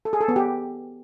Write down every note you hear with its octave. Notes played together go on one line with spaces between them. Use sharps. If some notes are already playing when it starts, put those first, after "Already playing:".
A4
G#4
A4
B3
G4